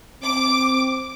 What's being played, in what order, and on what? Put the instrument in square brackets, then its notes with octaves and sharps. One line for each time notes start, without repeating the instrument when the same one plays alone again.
[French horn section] C4 [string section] D6